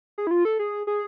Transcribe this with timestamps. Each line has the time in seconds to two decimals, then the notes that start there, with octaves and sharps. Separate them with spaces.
0.18 G#4
0.27 E4
0.31 F4
0.45 A4
0.59 G#4
0.87 G#4